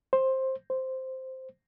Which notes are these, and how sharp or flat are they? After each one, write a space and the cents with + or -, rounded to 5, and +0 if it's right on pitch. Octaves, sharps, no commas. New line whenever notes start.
C5 +15
C5 +0